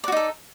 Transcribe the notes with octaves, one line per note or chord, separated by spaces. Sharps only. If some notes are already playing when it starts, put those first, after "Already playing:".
D#4 F#4 A4 D5